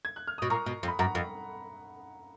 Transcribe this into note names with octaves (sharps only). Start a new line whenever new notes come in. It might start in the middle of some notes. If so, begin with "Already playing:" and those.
G#6
F#6
F6
B2 D#6
A#2 A#5 C#6
B2
F2
B5
F#2 F#5 A#5
F2